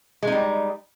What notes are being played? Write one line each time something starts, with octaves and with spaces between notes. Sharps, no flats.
G3 G#3 D#4